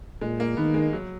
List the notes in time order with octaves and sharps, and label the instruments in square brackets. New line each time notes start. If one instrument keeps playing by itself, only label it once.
[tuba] A#2 [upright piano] G#3
[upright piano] A#3
[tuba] D#3 [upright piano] B3
[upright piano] G#3
F#3